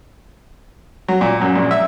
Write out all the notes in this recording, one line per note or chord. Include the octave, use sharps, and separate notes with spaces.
F#3
A#2
F#2
A#1
E5